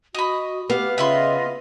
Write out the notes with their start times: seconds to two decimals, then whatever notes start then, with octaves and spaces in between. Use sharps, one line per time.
0.15 F#4 D#5 B5
0.70 B3 G4 F5
0.98 C#3 F4 D#5 E5 B5 C6